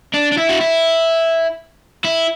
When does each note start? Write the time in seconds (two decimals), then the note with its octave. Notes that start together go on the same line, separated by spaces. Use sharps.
0.14 D4
0.32 D4
0.38 E4
0.49 F#4
0.61 E4
2.05 E4